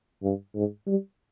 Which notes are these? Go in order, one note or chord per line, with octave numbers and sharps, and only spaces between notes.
G2
G#2
G3